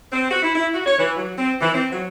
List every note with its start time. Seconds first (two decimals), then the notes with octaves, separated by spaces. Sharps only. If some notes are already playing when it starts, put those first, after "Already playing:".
0.12 C4
0.30 F#4
0.43 E4
0.55 E4
0.73 F#4
0.86 C#5
0.99 E3
1.17 F#3
1.38 C4
1.61 E3
1.74 C4
1.92 F#3